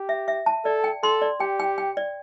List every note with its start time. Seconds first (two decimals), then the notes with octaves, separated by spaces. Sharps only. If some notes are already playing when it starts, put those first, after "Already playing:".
Already playing: G4
0.09 E5
0.28 E5
0.46 A5
0.65 A4 D5
0.84 G5
1.03 A4 C6
1.22 D5
1.40 G4 G5
1.60 G5
1.78 G5
1.97 D5